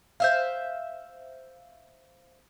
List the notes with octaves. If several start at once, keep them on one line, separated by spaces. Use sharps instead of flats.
C5 E5 F5